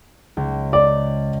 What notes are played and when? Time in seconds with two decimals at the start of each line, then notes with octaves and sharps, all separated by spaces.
0.37 C#2
0.73 D5